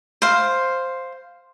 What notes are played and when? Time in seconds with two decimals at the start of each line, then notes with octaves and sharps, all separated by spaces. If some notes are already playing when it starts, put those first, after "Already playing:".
0.22 C5 F5